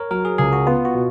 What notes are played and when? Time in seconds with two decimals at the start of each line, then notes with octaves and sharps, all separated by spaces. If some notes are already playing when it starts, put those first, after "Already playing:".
Already playing: A#4 C#5
0.11 F#3 A#4
0.25 G#4
0.38 C#2 G#4
0.53 F#4
0.67 B3 F4
0.85 F#4
0.95 B2